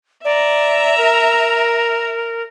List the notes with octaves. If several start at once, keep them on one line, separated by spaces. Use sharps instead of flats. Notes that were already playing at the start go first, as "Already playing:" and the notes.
D5 E5 A#5
A#4